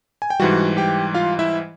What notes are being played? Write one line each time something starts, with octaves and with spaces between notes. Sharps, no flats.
G#5
G5
G#2 E3 G3 F#4 F#5
G4 G5
F4 F5
E4 E5